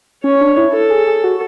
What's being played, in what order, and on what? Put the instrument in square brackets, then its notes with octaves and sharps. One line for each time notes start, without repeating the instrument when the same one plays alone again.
[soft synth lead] C#4 [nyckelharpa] C#5
[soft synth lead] D4
E4
[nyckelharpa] A4
[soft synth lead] G#4
G#4
F#4